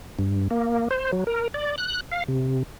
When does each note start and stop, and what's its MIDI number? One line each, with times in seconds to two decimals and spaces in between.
0.19 0.48 43
0.51 0.88 58
0.91 1.11 72
1.12 1.24 54
1.27 1.48 70
1.54 1.76 74
1.78 2.00 90
2.11 2.24 77
2.28 2.63 48